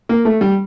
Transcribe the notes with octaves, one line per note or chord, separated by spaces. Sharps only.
A#3
A3
G3